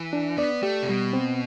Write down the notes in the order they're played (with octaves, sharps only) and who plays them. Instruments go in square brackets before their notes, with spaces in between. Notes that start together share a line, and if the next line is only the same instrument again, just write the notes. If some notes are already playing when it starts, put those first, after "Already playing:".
Already playing: [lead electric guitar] E3
[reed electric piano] D4
[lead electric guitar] B3 [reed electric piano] D5
[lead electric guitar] A3 [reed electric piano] G4
[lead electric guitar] C3
[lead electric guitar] B2 [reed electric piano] G3
[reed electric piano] C4